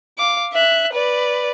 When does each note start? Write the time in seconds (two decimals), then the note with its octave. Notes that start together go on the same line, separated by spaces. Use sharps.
0.18 F5 D6
0.53 E5 F#6
0.93 B4 D5